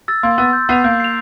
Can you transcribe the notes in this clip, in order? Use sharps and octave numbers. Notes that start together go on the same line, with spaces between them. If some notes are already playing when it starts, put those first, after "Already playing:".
E6 A6
A#3 C6
B3 E6 A6
G6
B3 C7 F7
A#3 G6
C7 F7